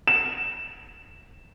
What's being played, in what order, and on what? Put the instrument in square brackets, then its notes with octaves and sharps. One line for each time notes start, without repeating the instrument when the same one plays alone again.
[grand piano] E7